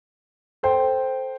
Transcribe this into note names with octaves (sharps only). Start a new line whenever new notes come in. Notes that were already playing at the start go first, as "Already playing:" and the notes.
A4 C5 G5